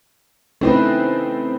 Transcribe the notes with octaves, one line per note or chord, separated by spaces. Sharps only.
A3 C4 C#4 D#4 E4 B4